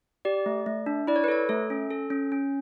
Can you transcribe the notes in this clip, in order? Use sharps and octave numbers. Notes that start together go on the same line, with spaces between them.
G4 D5
A3
A3
D4
E4 D5
C#5
B4
A4 C#5
A3 A4
C#4
A4
C#4
C#4